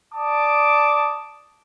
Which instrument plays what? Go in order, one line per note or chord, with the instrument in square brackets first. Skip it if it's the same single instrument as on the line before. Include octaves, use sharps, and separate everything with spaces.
[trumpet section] D5 A5 D6 D#6